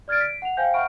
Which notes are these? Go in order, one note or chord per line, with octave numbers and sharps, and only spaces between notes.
D5 F6 G#6 A6 D7
B6 D7
F#5 F7
C5 F5 G5 G#5 G6
E5 F#5 B5 C#6 F6 D7